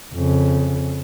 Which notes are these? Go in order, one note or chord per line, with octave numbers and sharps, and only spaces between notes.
F2 C#3